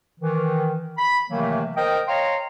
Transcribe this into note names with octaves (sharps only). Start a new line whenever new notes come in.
D#3 E3
B5
C3 D#3 E3 F#3 A3 A#3
A#4 C5 D#5 G5
C#5 D#5 F5 G5 A#5 C6